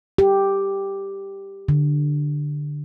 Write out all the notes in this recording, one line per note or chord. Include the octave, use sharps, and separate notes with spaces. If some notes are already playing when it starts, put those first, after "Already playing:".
G4
D3